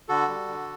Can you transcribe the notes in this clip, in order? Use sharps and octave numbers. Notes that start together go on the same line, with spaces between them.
D3 F#4 A4
G3
D3